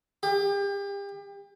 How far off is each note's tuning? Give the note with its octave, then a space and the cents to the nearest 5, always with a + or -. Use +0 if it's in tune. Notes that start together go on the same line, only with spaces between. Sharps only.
G4 +35